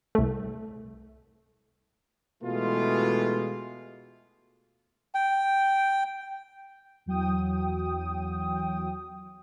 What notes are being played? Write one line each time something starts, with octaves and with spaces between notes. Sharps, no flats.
C2 A3
B2 E3 G#3 A3 F4
G5
E2 F#3 G5 D#6